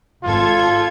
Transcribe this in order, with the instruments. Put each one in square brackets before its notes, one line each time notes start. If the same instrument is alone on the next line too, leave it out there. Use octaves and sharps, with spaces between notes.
[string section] G#1 A4 G#6 [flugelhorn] F4